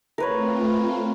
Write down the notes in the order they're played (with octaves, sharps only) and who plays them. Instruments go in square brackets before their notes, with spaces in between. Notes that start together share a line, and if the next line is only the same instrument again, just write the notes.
[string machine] A3 C4 F4 [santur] A#4 B4 C#5